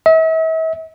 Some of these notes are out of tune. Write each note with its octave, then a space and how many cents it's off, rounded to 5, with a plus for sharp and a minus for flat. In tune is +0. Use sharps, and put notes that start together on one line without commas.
E5 -40